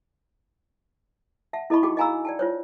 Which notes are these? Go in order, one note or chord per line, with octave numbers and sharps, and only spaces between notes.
E5 F#5 A5
E4 A4 D#5 A5 B5 C#6
D#4 F#4 G#4 A4 G5 D6
D#5 F5 G#5 A#5 B5 E6
D5 G5 A5
F4 C5 C#5